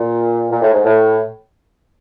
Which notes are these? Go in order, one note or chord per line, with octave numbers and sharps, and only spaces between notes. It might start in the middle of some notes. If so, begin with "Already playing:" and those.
Already playing: A#2
A#2
A2
G#2
A2